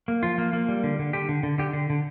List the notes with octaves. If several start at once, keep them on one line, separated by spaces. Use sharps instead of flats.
A#3
F3 F4
A#3
A#3
G3
D3
D3
D3 G4
D3
D3
D3 G4
D3
D3